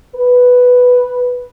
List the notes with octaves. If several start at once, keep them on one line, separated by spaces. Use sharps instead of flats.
B4